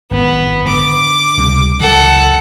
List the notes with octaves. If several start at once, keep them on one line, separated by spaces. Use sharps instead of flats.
G#1 F#2 A2 B3
D3 D6
C#2 C3 G3
F#1 C#2 E3 A4 F#5